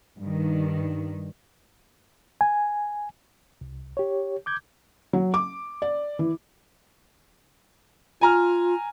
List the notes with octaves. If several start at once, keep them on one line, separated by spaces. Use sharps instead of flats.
G2 D#3
G#5
C2
G4 C#5
D6 G6 G#6
F#3
D6
D5
E3
F4 G#5 A#5 F6